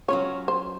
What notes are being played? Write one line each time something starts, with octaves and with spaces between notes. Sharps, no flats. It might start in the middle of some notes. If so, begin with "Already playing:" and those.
F#3 C#4 F4 C#5
C5